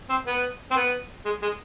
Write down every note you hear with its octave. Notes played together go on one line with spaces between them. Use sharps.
C4
B3
C4
B3
G#3
G#3